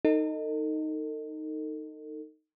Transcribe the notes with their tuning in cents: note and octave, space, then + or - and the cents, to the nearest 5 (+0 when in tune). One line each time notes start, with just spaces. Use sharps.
D#4 +0 A4 +40